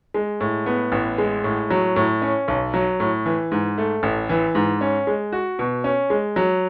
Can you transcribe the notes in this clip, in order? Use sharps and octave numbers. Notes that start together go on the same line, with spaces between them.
G#3
A2
B3
A1
G#3
A2
F#3
A2
C#4
B1
F#3
A2
E3
G#2
A3
A1
E3
G#2
C#4
G#3
F#4
B2
C#4
G#3
F#3